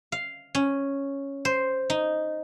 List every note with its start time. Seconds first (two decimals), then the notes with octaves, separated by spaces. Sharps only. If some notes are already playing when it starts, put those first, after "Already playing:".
0.12 F5
0.55 C#4
1.45 C5
1.90 D#4